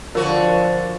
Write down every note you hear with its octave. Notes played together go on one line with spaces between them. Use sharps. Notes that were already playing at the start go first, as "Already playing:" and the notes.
D3 F3 F4 F#4 A#4 C#5